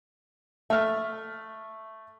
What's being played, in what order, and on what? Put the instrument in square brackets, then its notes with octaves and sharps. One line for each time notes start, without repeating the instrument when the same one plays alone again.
[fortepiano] A3 F6 [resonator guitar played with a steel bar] E5